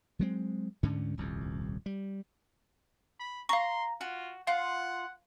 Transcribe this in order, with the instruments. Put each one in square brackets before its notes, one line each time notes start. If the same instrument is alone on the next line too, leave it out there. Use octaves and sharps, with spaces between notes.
[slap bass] F#3 G#3 C4
D2 G#2 D3 C#4
D#1 C2 F2
G3
[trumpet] B5
[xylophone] F5 C#6 [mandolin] A#5 [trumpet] C6
[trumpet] F4 [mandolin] F#4
[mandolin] F4 [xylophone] F5 [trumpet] F#5